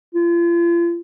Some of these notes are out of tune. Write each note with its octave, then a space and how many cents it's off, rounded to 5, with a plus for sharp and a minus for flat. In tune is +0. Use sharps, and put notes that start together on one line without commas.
F4 -40